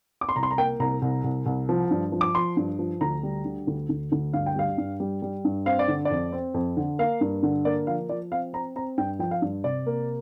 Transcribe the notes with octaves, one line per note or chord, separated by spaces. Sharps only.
D6
C6
C2 A#5
C6
A#5
A#3 G5
C2 A#5
C2
C2
C2
F3
G2
F3
D6
F3 C6
G2
F3
D2 A#5
G3
D3
D2
D2
D2
G2 F5
G5
G3 F5
G2
G3
G3
G2
C4 F5
D5
D3
D5
F2
C4
F2
D3
A#3 F5
G2
D3
A#3 D5
F3 F5
F3 D5
C4 F5
C4 A#5
C4 A#5
G2 G5
F3 G5
F5
G2
C3 D5
A#3